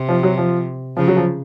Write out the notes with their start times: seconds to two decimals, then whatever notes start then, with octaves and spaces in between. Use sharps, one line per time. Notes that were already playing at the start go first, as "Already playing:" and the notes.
Already playing: C3
0.09 F3
0.23 F#3
0.38 F3
0.97 C#3 F3
1.08 F#3
1.17 F3